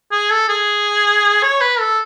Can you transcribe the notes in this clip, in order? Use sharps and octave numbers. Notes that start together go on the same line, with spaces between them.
G#4
A4
G#4
C#5
B4
A4